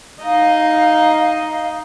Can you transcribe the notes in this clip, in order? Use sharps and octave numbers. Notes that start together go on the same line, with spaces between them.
D#4 D#5 F5